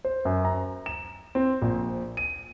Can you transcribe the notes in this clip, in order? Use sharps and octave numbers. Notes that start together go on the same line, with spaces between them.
C5
F#2
A#5
E7
C4
A#1
D#7